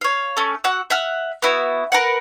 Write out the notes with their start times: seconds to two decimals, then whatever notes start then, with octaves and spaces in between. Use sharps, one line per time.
0.01 C#5 F5
0.37 A3 C#4
0.64 F#4 F#5 E6
0.90 E5 F#5 F6
1.42 B3 E4 F#4
1.92 A#4 B4 F#5